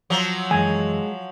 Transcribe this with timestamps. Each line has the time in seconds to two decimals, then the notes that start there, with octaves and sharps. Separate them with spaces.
0.10 F3 F#3
0.51 F#2 E3 G#3 G#5